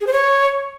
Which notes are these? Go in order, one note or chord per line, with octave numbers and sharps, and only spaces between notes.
G#4
C5
C#5